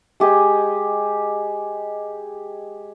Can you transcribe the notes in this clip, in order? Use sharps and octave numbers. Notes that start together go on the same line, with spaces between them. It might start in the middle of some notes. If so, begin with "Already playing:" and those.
G#3 G4 G#4 D#5